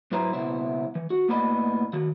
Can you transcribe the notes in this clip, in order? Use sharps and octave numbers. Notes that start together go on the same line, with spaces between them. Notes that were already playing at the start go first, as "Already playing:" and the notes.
G#2 F#3 E4 B4 C5 A#5
C#2 B2 B3 E4 C5 E5
E3
F#4
A2 A#3 B3 D5 D#5 B5
D#3 F#4